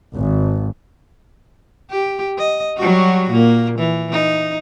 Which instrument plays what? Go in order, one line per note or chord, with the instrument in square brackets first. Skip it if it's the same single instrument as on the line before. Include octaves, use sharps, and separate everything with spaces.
[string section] G#1
[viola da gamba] G4
D#5
F#3 G3 F#4
A#2 A#3
E3
D#4